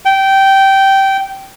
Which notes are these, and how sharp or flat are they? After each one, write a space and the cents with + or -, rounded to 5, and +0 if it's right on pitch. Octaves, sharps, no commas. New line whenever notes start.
G5 -15